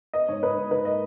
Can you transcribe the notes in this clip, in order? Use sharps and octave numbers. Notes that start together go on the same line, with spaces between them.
B3 D#5
G#2 C#5
G#2 B4
G#2
G#2 B4
A#3 D#5